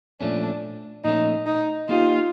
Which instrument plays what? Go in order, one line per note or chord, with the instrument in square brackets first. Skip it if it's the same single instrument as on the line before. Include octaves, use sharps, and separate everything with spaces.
[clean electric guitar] A#2 F3 A3 C#4 [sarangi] D4
[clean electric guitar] A#2 F3 A3 C#4 [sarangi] D#4
[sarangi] D#4
[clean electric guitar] A#3 D#4 G4 C5 D#5 [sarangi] F4